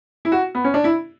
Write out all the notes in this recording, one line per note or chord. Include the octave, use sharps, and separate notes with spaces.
E4
F#4
B3
C#4
D4
E4